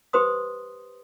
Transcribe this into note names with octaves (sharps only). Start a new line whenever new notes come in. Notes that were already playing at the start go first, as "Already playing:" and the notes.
G4 B4 C5 C6 D#6